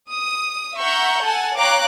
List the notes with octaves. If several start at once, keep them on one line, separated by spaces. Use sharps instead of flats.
D#6
E5 F#5 A#5 C#6 G6
A4 F#5 G#5 A5
C#5 F5 G5 A#5 D6 F#6